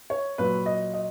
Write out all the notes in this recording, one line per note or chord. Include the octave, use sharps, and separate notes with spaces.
C#5
A#2 F#3 B4
D#5
D#5